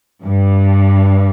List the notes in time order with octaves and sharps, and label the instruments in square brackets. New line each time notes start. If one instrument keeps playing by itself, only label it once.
[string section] G2